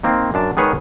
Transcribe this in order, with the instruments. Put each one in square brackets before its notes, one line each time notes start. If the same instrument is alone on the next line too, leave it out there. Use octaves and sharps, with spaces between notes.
[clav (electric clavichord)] D#3 A#3 C4
F#2 D4 A5
D#3 G#3 B3 G#4 B4 C#5